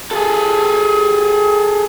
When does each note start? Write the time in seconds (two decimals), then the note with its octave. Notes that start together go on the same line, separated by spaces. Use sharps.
0.11 G#4 A4